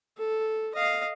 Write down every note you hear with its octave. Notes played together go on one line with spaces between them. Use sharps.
A4
D#5 F5